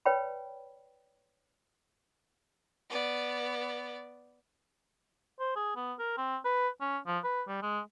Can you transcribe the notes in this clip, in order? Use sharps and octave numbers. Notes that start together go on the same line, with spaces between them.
B4 C#5 D5 G5 B5
B3 D5
C5
G#4
B3
A#4
C4
B4
C#4
F3
B4
G3
G#3